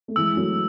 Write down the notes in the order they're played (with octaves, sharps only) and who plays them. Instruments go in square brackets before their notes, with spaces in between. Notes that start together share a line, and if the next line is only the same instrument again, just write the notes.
[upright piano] A3
[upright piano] E3 G#3 [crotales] E6
[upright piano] F#3 A3